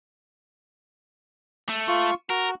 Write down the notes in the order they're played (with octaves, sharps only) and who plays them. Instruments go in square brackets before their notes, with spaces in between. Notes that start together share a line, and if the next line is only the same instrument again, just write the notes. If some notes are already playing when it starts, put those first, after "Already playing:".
[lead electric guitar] A3
[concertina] F4 C#6
[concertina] F#4 [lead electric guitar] A#4